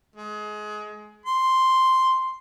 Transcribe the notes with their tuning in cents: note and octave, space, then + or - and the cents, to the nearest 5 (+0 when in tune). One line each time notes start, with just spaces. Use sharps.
G#3 +25
C6 +0